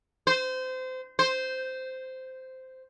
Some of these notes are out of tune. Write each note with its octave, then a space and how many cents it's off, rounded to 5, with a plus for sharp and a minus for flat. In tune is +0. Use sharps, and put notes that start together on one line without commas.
C5 -25
C5 -10